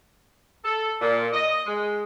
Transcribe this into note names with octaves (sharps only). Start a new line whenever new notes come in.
A4
A#2
D#5
G#3